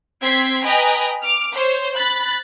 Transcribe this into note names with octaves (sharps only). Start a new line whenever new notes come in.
C4 C6 G#6 B6
B4 D#5 G5 G#5 A#5
D6 F6
C5 C#5
B5 F#6 A6